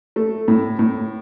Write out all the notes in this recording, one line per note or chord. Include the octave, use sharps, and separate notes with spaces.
A3
A2
A2